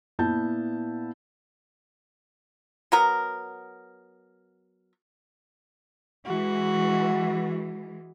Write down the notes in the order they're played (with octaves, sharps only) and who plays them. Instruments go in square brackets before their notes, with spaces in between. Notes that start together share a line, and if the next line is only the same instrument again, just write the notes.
[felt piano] A#2 B3 E4 A5 G6
[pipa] F#3 B3 A#4
[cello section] E3 G#3 [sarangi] F#4